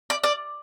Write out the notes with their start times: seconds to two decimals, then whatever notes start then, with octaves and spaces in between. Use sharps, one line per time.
0.10 D5
0.24 D5